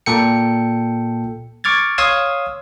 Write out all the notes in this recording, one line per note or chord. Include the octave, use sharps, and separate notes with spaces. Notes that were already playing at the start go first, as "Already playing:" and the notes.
A#2 A4 G5 C#7
C#6 D6 F6 G#6 A6
C#5 F5 C6 D#6 E6 G#6